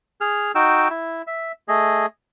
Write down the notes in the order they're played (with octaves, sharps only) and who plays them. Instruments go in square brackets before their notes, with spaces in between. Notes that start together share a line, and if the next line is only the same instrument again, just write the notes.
[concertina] G#4 F6
D#4 F#4 G5 E6
E4
E5
A3 G#4 D#5